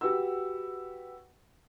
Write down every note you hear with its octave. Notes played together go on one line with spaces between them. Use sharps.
F#4 G4 B4 F#5 E6